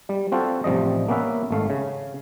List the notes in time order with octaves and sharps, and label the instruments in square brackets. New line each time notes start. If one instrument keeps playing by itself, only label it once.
[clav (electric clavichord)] G3
C4 F4 F#4 A4 C5
A1 C3 F3 G3 D#5
A#3 B3 C#4 B4 E5
G#1 A3 F5
C#3